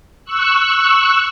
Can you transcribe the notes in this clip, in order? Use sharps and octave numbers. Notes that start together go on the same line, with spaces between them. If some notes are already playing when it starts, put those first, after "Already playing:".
C#6 E6 F#6